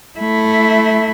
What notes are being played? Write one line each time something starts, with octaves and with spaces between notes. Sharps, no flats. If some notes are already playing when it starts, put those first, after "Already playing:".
A3 E4